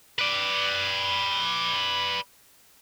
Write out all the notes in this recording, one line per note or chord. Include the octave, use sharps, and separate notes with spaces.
B4 D5